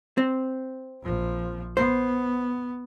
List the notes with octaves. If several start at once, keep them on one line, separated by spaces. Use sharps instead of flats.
C4
A#1 F3
B3 C5